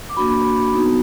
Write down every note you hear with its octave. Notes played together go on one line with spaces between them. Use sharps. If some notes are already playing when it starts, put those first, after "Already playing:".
D6
A#3 D4 F#4 B5
B3 D#4 F#4